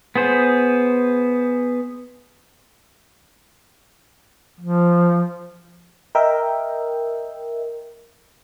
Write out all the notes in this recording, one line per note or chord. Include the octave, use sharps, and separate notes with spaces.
B3 G#4 C5
F3
A#4 D#5 E5 G5